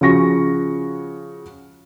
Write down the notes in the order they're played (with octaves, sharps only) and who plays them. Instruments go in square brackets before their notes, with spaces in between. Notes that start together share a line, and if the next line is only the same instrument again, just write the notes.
[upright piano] C#3 F3 F#4 C#6 A#6